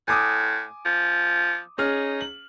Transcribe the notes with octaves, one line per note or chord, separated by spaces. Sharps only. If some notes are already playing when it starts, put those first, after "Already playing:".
A2 G#5 D6 D#6
F3
C#4 D#4 G#4 F6
F#7